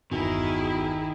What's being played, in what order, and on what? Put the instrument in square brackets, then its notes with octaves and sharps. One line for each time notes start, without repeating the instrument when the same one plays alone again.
[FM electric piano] G1 E2 G#5 [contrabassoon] B2 [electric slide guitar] D#3 [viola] E4 G#4